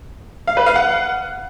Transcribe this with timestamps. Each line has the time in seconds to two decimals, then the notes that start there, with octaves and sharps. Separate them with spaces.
0.47 F5
0.57 B4
0.66 F5
0.76 F#5